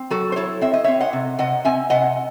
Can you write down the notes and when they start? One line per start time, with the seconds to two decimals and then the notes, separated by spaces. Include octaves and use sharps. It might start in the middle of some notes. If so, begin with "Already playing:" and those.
Already playing: C4
0.10 F#3 F#4 A4
0.32 C5
0.36 E4 A4 C#5
0.61 C4 E5
0.73 D#5
0.84 C4 C#5 E5
1.00 D#5 F#5
1.13 C3
1.39 C3 D#5 F#5
1.65 C4 E5 G#5
1.90 C3 D#5 F#5